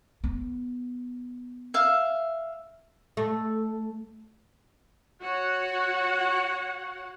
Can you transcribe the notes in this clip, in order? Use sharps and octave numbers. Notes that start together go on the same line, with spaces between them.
B3
E5 F5
A3
F#4 C#5 F#5